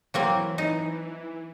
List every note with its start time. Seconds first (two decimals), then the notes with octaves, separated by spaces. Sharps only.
0.14 E3 F#3 A#3 C4
0.58 D#4